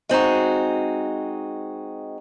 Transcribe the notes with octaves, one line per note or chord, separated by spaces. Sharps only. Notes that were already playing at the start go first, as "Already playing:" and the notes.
G#3 C4 D#4 F#4